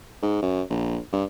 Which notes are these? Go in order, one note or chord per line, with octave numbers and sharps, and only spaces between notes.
G#2
F#2
A#1
G2